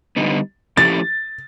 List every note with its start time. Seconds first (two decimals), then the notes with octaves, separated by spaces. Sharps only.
0.17 D3 G3 B3 D#4
0.77 F3 A3 C#4 E4 G4 A6